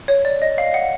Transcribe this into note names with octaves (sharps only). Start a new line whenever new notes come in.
C#5
D5
D#5
F5
F#5